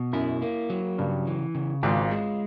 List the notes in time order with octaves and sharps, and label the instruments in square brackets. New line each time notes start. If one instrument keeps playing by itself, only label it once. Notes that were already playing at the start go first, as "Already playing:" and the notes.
Already playing: [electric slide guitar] B2
[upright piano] F#2 [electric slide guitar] E4
[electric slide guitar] A#3
F#3
[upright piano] G2 [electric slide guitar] C#3
[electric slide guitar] E3
C#3
[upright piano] G#1 G#2 [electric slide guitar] F4
[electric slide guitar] G#3